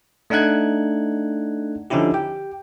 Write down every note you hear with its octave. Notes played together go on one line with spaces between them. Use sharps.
A3 D4 D#4 F#5 F#6 G#6
D3 F3 C#4 D#4 E4 G4
G4 G5